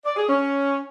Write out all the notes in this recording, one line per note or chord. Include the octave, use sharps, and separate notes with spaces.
D5
G#4
C#4